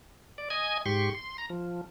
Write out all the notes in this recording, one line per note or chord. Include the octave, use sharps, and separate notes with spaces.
D5
D#5 G#5 G#6
G#2 G4 C6 C#6
C6
A#5
F3